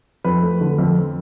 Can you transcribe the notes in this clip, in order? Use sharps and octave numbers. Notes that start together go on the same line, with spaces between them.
F2 B4
A3
D3
F2